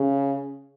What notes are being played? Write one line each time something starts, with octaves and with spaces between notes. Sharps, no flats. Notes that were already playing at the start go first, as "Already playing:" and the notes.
Already playing: C#3